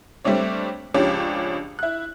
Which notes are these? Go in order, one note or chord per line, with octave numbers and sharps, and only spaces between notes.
G3 A3 C4 D4 C#5
C#2 F3 C#4 D4 G4 C#5
E4 F#6